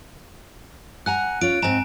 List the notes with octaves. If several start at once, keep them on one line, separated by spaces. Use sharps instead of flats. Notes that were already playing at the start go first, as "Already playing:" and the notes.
F#5 G#5 A#5 F#6
C#4 F4 D7
G#2 C4 G#5 A#5 E7